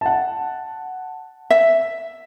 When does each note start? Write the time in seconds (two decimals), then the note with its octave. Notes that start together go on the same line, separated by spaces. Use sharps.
0.01 F#5 A5
1.50 E5